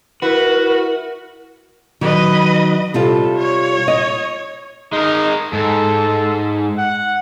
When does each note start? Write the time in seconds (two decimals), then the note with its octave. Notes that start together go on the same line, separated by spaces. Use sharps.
0.22 E4 F#4 A#4 B4
2.01 D#3 F#3 B4 D#5
2.94 C3 G3 F4 A4
3.38 C#5
3.88 D#5
4.93 G#3 D#4 A#4
5.53 G#2 A4
6.78 F#5